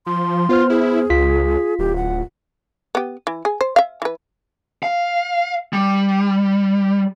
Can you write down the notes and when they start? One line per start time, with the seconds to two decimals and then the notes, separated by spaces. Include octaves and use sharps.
0.06 F3 C6
0.49 B3 F4 C5 F6
0.70 E4 G#4
1.10 C#2 F4 B6
1.79 D1 G4
1.96 F#5
2.95 B3 G4
3.27 E3
3.45 G#4
3.61 C5
3.76 E5 F5
4.02 E3 B4
4.83 F5
5.73 G3